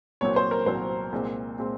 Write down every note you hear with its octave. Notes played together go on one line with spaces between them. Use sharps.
C2 A#2 F#3 C4 C#5
C5
A#4
C2 A#2 F#3 C4 C5
C2 A#2 G#3 C4
A#2 G#3 C4